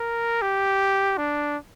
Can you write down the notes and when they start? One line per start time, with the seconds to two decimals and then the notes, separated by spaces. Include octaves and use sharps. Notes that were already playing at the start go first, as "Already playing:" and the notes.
Already playing: A#4
0.42 G4
1.18 D4